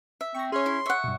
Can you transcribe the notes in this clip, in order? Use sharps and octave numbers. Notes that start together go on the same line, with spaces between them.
E5
C4 C#6 A#6
C#4 G#4 C#5 C6
E4
E5 F#5 C#6
G2 B2